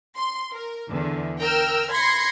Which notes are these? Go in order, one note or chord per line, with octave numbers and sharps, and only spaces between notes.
C6
A#4
E2 D3
A#4 G5 E6 F6
B5 C6 G#6 A#6 C7 C#7